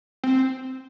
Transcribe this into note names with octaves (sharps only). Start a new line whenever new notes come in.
C4